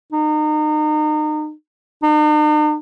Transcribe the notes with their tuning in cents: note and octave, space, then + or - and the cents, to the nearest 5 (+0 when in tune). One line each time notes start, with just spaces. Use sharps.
D#4 -35
D#4 -45